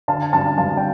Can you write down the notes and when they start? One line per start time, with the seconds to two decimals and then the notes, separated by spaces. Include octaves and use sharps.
0.08 D3 F5 A5
0.33 G2 F5 A5
0.58 G2 F5 A5
0.77 G5